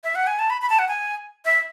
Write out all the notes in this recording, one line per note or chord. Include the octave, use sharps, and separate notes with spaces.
E5
F#5
G#5
A5
B5
B5
A5
F#5
G#5
E5